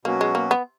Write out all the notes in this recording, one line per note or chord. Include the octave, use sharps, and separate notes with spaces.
B2 F#3 A#3 C#4 F#4
G#3
A#3
B3